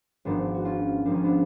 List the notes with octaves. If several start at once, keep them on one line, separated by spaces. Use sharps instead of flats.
G#1 G#2 F3 B3 D4
F#4
C#4 F4
G#1 G#2 F3 D4
C#4
B3 D4